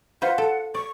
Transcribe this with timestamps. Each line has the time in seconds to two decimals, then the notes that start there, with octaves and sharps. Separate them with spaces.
0.22 F4 B4 C5 F#5
0.38 A4
0.75 D5 C#6